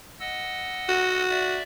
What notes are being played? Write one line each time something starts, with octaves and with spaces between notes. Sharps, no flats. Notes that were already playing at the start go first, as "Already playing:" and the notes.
D#5 F#5 E6
F#4
D5 E5